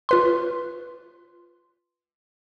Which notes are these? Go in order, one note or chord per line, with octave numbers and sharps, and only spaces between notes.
F4 B4 C6